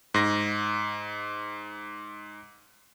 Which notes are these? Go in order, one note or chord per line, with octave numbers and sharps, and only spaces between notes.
G#2 A#6